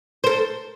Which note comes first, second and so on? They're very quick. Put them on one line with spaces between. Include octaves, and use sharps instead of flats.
C5 A#4 A4